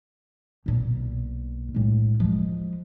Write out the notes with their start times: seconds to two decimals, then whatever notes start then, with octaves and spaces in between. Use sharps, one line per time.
0.66 B1 A#2
1.74 A2 G#3
2.20 F3 G#3